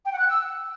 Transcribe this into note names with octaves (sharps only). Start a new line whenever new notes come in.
G5
F#5
F#6
E6